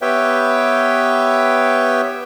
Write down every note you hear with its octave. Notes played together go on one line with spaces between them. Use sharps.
B3 G4 B4 C#5 E5 G5